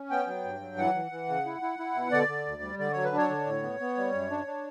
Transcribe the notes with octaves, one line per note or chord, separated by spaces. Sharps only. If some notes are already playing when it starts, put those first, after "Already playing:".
Already playing: C#4
B3 G5
F#3
G2
F#3
E3 F#5
E3
E3
C#3
E4
E4
E4
B2
D3 D5
D3
D2
G3
D3 D5
F#3 C#5
B4
D4
C#5
D3
A2
B3
B3
G3
F#2
D4
D4